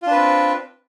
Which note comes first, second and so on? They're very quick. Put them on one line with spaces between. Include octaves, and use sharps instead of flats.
F4 D4 B4 C4